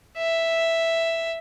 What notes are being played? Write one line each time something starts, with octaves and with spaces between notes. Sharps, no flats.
E5